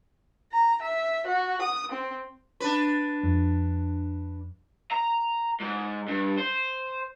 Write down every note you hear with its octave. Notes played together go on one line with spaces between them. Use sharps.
A#5
E5
F#4
D#6
C4
D4 B4
F2
A#5
G#2
G2
C5